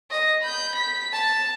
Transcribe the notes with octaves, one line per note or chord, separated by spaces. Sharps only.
D#5
B5 G6
B6
A5